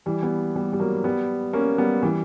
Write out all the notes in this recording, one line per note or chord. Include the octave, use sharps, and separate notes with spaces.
E3 G3
G3 B3
G3 B3
G3
F#3 A#3
G3 B3
A#3 C#4
G3 B3
E3 G3